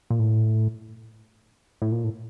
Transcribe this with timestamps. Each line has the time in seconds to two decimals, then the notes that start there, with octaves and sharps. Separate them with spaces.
0.10 A#2
0.19 A2
1.82 A2
1.92 A#2
2.04 A2